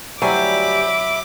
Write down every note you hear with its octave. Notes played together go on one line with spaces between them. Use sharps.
D2 F#3 G3 E4 E5 G#5 B5 D6